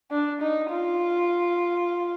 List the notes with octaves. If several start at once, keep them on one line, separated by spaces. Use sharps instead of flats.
D4
D#4
F4